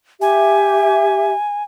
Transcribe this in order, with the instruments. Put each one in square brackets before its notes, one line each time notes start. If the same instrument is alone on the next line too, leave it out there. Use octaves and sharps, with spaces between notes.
[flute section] G4 E5 [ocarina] G#5